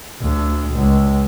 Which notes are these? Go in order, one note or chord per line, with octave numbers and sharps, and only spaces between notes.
D2
C#2